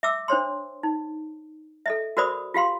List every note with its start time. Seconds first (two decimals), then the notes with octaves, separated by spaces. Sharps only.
0.03 E5 D6 E6
0.28 D4 C5 C#5 C6
0.83 D#4
1.86 A4 D#5 E5
2.17 F#4 A#4 C5 D5 B5 D#6
2.54 F4 G4 F5 C6